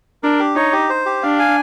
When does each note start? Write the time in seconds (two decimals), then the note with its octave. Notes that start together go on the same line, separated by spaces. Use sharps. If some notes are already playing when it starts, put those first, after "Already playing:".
0.23 D4 A#4
0.39 G4
0.56 D#4 C#5
0.73 G4
0.90 C5
1.06 G4
1.23 D4 F5
1.39 G#5